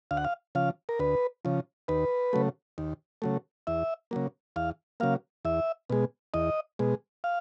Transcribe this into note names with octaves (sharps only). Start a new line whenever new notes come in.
D2 F5
F#5
F5
C#3 F3 F5
A#4
D2 B4
C#3 F3
D#2 B4
C#3 F#3 A3
D#2
C#3 F#3 A3
E2 E5
C#3 F#3 A#3
E2 F5
C#3 F#3 A#3 F5
E2 E5
B2 G#3
E2 D#5
B2 G#3
F5